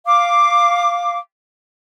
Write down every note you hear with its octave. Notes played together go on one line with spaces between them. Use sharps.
F5 D6